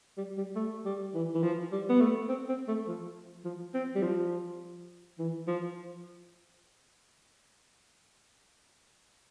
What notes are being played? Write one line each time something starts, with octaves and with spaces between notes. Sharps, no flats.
G3
G3
A3
G3
E3
E3
F3
G3
B3
A3
C4
C4
A3
F3
F3
C4
G3
F3
E3
F3